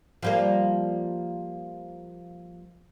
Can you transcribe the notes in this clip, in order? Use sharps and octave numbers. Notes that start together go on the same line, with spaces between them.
F3 G3 A#3